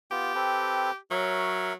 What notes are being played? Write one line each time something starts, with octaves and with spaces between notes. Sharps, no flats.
B3 F4 G4
C4 A4 B4
F#3 A#4 C#5 E5